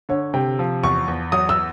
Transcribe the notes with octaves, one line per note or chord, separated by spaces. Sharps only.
D3 C#5
C3 G5
F3
E2 C#6
E2
F#3 D#6
E6